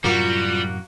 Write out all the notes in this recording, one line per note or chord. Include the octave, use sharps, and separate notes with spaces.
F#2 A2 C3 G3 A#3 F4 F#4